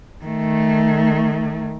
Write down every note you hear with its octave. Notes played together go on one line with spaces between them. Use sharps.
D#3 A3